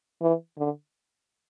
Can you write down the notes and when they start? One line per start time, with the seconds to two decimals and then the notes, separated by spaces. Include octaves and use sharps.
0.22 E3
0.58 D3